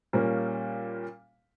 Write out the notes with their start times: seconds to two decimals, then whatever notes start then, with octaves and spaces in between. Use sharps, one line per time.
0.13 A#2 G3 A#3 C#4